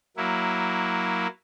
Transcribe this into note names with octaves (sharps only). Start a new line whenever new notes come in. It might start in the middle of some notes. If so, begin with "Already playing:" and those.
F#3 A#3 E4